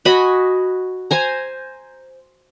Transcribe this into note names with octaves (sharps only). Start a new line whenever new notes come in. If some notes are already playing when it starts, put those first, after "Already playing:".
F#4 D#5 G#5 B5
C5 G#5 A#5